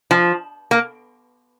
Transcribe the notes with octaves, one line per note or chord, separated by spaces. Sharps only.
F3
A#3